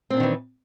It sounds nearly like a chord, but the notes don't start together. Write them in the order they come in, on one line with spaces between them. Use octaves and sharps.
C4 A#2 D4 D#3 E3